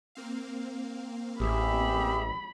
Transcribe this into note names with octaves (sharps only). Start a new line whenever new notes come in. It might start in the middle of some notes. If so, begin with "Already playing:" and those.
A#3 C4 F5
A1 G4 G#4 E5 B5